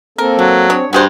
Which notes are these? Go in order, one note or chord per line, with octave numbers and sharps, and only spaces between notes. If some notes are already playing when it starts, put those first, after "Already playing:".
A#3 C4 A4 A#4
F#3 D4
C4 D4 G#4 C#5
G2 B3 F#4 G#4 B4 C5 F#5